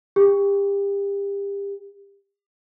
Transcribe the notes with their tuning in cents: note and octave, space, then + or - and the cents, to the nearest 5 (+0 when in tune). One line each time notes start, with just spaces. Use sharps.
G4 +30